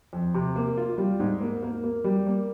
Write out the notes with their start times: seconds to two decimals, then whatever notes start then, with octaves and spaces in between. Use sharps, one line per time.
0.13 F2
0.34 C3
0.56 A#3
0.77 F4
0.98 G3
1.20 G#2
1.41 A#3
1.62 A#3
1.84 A#3
2.04 G3
2.27 A#3